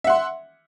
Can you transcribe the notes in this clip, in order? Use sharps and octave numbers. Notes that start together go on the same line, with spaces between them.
E5 F#5 C6